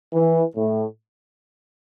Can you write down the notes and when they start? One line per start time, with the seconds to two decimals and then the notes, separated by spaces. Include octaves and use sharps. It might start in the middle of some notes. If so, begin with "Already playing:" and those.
0.14 E3
0.56 A2